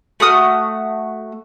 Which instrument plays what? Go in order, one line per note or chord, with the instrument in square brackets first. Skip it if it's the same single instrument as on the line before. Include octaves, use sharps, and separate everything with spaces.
[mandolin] A3 F#4 D#6 F6